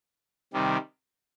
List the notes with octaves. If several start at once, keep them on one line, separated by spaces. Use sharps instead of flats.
C3 D#3 G3